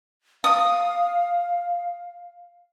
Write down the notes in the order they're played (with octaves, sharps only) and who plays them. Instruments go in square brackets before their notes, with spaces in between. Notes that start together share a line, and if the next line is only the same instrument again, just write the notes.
[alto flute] F5 [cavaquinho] D#6